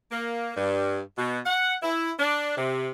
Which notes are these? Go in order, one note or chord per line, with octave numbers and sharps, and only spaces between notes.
A#3
G2
B2
F#5
E4
D4
C3